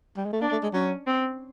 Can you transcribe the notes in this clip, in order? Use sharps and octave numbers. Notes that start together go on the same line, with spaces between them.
G3
G#3
A3
A#3 D4
A3
G#3
F#3 C#4
C4